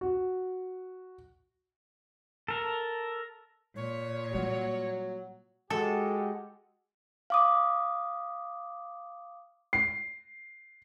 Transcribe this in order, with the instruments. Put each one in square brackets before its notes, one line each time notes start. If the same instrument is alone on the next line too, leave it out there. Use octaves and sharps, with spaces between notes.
[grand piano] F#4
[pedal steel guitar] A4 A#4
[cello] A#2 [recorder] C#5
[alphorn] F#3 [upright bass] G3 A#3
[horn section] G#3 F#4 G4 [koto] A4
[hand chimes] F5 D6 D#6
[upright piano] C7